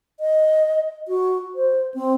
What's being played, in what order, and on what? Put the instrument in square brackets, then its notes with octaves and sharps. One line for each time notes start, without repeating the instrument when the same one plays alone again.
[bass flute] D#5
F#4
C5
C4